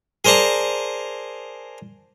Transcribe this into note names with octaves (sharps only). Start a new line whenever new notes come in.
G#4 A#4 C5 D5 A5 A#5